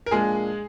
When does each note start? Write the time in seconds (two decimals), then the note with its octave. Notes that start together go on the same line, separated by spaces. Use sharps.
0.06 A#4
0.11 A#2 F3 G#3 A#3 D4 G#4